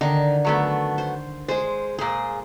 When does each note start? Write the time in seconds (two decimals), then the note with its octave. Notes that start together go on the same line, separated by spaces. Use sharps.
0.01 D3 D#3 D#4 D6
0.45 F#3 A3 B3
0.98 C5
1.48 G#3 G#4 C5
1.99 A#2 G#4 C5